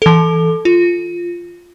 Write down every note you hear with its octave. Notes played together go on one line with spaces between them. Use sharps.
E3 A4
F4